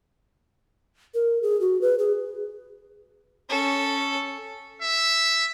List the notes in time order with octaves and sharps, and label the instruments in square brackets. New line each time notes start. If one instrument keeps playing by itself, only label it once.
[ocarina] A#4
G#4
F#4
B4
G#4
[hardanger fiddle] C#4 A4
[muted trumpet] E5